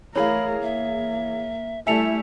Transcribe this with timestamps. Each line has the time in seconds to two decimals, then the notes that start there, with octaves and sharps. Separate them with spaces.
0.15 E3 A3 G#4 A#4 C#5 F5 B5
0.63 A#3 E5
1.87 G3 A3 E4 A4 E5 G#5 C#7 F7